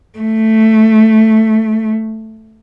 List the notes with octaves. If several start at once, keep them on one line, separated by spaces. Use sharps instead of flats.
A3